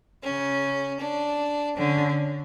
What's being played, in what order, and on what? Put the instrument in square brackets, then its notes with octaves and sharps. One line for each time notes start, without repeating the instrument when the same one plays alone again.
[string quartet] C#3 [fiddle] C#4
[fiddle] D4
[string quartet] D3 [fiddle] C#4